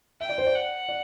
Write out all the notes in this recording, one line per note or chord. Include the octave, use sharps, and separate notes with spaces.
E5 G5
D5
C5
D5
F#5
D5